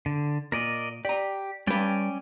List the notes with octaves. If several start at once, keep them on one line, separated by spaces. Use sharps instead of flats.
D3
A#2 A#4 D5 D#5
G4 D5 A#5
G3 C#4 B4 D5 G5